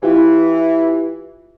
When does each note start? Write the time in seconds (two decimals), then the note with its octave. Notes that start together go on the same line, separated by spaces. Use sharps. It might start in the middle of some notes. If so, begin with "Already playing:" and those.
0.03 E3 E4 F4 G4